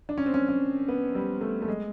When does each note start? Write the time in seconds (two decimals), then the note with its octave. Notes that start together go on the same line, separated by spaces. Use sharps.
0.09 D4
0.18 C#4
0.26 C4
0.34 C#4
0.49 C#4
0.88 B3
1.15 G3
1.41 A3
1.62 A3
1.68 G#3